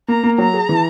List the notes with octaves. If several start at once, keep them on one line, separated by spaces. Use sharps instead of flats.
A#3 A#5
A#3
F#3 A#5
G#4
E3